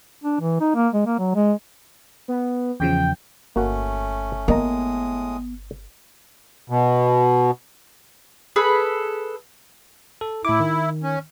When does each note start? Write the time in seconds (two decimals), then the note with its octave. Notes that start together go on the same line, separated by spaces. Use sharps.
0.24 D4
0.40 E3
0.61 D#4
0.75 A#3
0.94 G#3
1.06 A#3
1.19 F#3
1.35 G#3
2.28 B3
2.80 E2 C#3 F3 G5
3.56 G1 A3 A#3 C#4 F#4 F#5
4.48 A2 G#3 A#3 B3 D#5 A#5 D#6
6.70 B2
8.56 G#4 A4 B4 B5
10.21 A4
10.45 A2 E4 D6
10.60 D#3
11.03 C#4